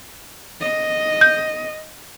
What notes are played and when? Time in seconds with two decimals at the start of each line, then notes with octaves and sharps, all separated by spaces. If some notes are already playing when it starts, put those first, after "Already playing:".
0.61 D#5
1.21 G6